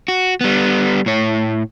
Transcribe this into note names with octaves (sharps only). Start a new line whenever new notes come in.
F#4
G3 B3
A2 C#5